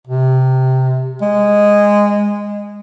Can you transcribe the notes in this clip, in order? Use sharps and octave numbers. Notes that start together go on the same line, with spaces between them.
C3
G#3